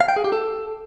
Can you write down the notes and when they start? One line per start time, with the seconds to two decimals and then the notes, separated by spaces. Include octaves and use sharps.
0.01 F5
0.08 G5
0.16 G#4
0.24 G4
0.32 A4